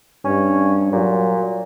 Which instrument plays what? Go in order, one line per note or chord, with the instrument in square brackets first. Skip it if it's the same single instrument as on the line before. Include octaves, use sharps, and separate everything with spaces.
[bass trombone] G2 [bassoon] C#4
[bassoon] A#2 [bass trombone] F#3